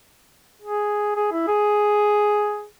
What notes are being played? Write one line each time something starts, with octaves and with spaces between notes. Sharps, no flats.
G#4
G#4
E4
G#4